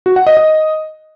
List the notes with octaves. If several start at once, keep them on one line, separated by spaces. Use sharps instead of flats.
F#4
F#5
D#5
D#5